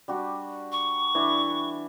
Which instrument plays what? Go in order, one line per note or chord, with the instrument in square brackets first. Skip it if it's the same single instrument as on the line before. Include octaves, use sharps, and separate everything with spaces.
[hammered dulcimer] G3 D4 F#4
[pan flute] C#6
[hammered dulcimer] E3 D4 E4